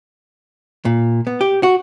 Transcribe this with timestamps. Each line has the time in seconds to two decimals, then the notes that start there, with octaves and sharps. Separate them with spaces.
0.85 A#2
1.27 B3
1.41 G4
1.63 F#4